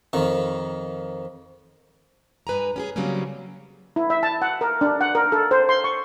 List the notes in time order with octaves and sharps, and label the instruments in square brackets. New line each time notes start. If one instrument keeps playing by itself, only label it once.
[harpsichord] F2 D#3
[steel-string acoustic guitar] G2 B4 G#5 A#5
C#4 G4 G#4
C#3 F#3 G3 A#3 C4 C#4
[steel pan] E4
E5
A5
F#5
A#4
D4
F#5
A#4
A4
C5
C6
C#6